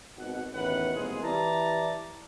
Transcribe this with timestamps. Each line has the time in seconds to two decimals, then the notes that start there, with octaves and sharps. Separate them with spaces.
0.16 G#1 B2 F#5
0.54 A1 E2 B2 D#3 B4 F#5
0.94 C2 B2 G#3 A#3 F4 G#4
1.23 E3 G4 D5 E5 A5 A#5